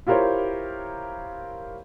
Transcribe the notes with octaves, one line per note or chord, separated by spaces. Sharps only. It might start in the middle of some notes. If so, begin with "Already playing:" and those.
E4 F4 G4 A#4 C5 C#5